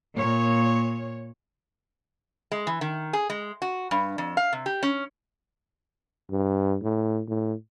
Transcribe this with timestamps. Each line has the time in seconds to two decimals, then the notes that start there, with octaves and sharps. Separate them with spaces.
0.16 A#2 C#5
2.51 G#3
2.67 E3
2.81 D#3
3.13 G#4
3.30 G#3
3.62 F#4
3.91 G2
4.18 F2
4.37 F5
4.53 C3
4.66 G4
4.83 C#4
6.30 G2
6.83 A2
7.28 A2